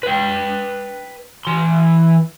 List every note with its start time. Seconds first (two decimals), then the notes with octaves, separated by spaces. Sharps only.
0.03 B4 G5
1.45 E3 C6